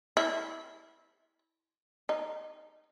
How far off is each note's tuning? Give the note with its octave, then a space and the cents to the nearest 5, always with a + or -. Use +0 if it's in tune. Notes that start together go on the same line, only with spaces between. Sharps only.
E4 -20
D#4 -10